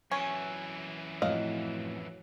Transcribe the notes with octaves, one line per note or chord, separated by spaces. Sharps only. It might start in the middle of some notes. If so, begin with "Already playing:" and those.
F#2 E3 C#4
F2 A2 F#3 D#5 F5